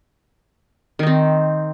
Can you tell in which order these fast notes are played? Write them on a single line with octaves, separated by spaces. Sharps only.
D#3 D#4 C4